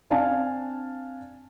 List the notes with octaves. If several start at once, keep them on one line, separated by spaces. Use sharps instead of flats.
C4 D4 F5 G#5 A5